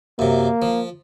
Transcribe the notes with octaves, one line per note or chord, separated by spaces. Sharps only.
F#2 C3 A#3
F3